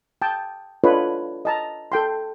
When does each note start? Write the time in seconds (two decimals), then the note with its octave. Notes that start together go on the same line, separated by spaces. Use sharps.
0.22 G5 A5 D#6
0.84 D4 F4 A4 B4 C#5 D#5
1.45 D#5 A5 A#5
1.92 A4 G5 C6